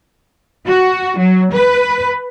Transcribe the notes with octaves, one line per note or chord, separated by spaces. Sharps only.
F#4
F#3
B4